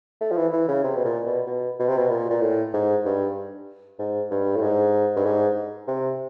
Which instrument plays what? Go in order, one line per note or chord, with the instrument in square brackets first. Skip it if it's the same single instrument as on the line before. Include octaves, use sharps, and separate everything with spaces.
[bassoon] A3
F3
E3
E3
C#3
C3
B2
A#2
B2
B2
B2
C3
B2
A#2
A#2
A2
G#2
G2
G#2
G2
A2
G#2
G2
G#2
C3